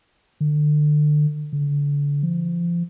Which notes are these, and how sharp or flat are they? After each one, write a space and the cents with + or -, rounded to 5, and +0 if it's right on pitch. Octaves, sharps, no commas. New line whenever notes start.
D3 +30
D3 -35
F3 -30